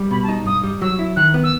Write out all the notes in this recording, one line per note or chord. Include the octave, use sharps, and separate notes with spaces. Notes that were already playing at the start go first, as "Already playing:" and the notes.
Already playing: G3
B2 B5
A5
D#4
G2 D#6
G3
F#3 E6
E4
D#3 F#6
B3
E6